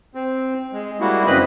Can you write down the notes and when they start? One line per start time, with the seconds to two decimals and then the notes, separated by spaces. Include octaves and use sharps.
0.15 C4
0.73 G#3
1.01 G3 G#3 A#3 E4 F#4
1.27 F#2 C#3 C4 B4 D#5 B5